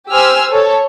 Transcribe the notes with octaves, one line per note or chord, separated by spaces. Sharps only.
G4 C5 G#5 E6 F6
A4 C#5